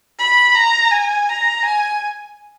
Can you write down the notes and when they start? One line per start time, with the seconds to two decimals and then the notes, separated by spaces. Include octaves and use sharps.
0.19 B5
0.55 A#5
0.91 G#5
1.29 A#5
1.65 G#5